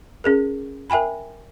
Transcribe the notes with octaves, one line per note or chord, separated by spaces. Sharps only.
C#4 G#4 A#4
A#4 E5 G5 G#5 B5